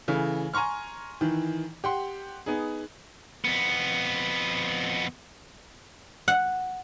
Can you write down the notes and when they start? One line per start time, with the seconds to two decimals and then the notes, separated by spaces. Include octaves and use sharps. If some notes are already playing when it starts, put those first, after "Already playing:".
0.08 C#3 E3 A3
0.54 G#5 A#5 C6 C#6 F6
1.21 D#3 E3
1.84 G4 F#5 C6
2.46 B3 D#4 G#4
3.45 F2 B3
6.28 F#5